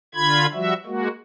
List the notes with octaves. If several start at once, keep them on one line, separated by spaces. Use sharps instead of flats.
D3 F4 B5 G#6
F3 G3 F#4 E5
G#3 A#3 F#4